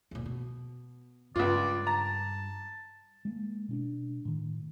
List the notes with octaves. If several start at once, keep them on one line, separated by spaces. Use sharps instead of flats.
D#2 A#2
B2
C#2 G2 F4 D5
A5 A#5
G#3 A#3
B2 C#4 D4
A2 D#3